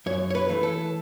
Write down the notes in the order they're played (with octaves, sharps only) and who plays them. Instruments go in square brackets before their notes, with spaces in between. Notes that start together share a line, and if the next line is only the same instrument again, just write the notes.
[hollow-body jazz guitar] F#2 C#5
C#5
B4
E3 A3
A4